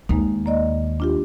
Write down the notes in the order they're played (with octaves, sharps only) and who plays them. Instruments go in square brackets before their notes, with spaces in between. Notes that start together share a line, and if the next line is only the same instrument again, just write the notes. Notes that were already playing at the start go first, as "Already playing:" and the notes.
[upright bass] D#2 [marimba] G#3 A#3 D#4
[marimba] A#3 D5 D#5
D4 F4 G4